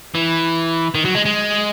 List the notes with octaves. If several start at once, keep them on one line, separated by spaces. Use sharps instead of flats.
E3
D#3
F#3
G#3
G#3